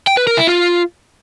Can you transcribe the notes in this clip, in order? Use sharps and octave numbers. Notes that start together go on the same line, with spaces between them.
G5
B4
A#4
E4
F4